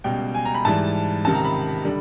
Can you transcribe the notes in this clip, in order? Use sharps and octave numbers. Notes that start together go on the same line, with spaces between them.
C#2 B2 G3 G5
G#5
A#5
B5
G#2 E3 G3 A5
C#2 C3 D#3 A5
A#5
B5
D3 G3